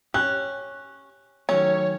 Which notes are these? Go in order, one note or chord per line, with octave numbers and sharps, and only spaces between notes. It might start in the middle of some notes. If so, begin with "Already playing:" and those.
C#4 G4 F#6
D#3 F#3 A3 C#4 C#5